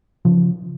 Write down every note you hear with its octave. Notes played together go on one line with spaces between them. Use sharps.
C#3 F3